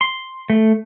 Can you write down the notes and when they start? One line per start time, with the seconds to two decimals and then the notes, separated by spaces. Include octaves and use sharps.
0.01 C6
0.50 A3